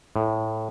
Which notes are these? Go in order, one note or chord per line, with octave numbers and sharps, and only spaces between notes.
A2